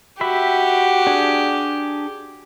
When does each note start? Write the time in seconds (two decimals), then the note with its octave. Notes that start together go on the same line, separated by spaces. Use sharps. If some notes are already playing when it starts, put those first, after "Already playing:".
0.21 F#4 G4 E5 B5
1.07 D4 G#4